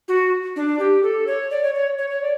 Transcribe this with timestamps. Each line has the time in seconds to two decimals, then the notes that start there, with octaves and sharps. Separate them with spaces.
0.08 F#4
0.56 D4
0.79 G4
1.03 A4
1.27 C#5
1.51 D5
1.63 C#5
1.75 C#5
1.98 C#5
2.10 C#5
2.22 D5